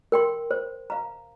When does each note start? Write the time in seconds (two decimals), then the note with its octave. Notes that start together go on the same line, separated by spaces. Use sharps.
0.12 A#4 G5 C6
0.51 C5
0.90 F5 A#5